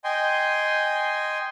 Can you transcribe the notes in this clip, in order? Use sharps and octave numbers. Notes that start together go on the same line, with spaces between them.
D#5 G5 G#5 C6